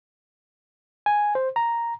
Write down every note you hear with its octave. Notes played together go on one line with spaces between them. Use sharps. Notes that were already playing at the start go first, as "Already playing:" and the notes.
G#5
C5
A#5